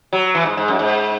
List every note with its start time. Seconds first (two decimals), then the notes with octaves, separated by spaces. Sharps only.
0.13 F#3
0.35 E3
0.46 G#2
0.57 G#2
0.68 F#2
0.79 G#2